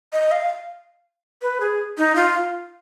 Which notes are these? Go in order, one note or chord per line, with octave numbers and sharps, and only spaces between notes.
D#5
F5
B4
G#4
D#4
F4